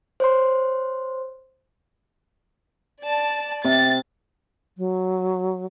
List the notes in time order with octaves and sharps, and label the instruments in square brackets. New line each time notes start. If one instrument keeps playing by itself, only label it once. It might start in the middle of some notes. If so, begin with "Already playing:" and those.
[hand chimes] C5 C#5 C6
[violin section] D5 A5
[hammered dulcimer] C3 [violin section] A6
[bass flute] F#3